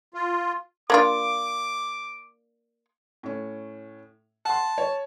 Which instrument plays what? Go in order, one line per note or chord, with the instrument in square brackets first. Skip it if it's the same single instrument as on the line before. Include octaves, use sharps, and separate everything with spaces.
[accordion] F4
[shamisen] A#3 D4 F4 [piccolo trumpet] D6
[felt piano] A2 C#4
[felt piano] F#5 C6 [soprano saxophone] A5
[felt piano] C#5